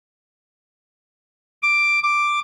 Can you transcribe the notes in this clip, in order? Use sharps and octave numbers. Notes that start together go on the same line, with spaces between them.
D6
D6